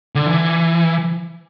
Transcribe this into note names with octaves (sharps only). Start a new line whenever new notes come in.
D3
E3